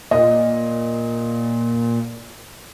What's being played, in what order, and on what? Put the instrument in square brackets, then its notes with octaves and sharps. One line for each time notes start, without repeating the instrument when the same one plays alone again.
[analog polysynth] A#2 [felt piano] D#5